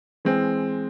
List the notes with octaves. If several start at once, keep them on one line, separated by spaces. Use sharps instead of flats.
E3 G#3 C4